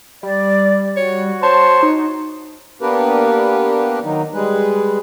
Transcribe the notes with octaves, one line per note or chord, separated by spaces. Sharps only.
G3 D5
F#4 C#5
C5 C#5 A5
D#4
A#3 B3 D4 G4 A#4 B4
D#3 F#3 D#4
G3 G#3 G#4 B4